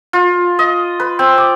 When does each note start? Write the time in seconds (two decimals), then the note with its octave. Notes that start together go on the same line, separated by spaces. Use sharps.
0.13 F4
0.59 D#5
1.00 B4
1.19 C4
1.38 D6